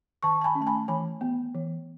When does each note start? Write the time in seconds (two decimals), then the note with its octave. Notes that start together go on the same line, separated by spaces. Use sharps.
0.23 D#3 A5 C#6
0.41 A5
0.44 G#5 B5
0.55 C#4
0.60 A3 A5
0.67 G#5 B5
0.88 E3 G#5 B5
1.21 B3
1.55 E3